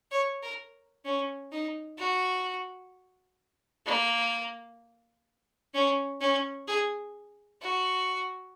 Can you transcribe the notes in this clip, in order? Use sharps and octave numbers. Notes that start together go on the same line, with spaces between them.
C#5
A#4
C#4
D#4
F#4
A#3
C#4
C#4
G#4
F#4